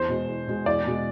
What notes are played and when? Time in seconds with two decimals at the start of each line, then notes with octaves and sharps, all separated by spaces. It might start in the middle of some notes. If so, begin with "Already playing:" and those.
Already playing: E2 C5
0.09 B2 G#3
0.27 E2
0.47 B2 G#3
0.66 E2 D5
0.86 B2 G#3